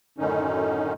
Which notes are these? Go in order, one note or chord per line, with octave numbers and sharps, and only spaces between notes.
F#2 A2 D3 D#3 C#4 D#4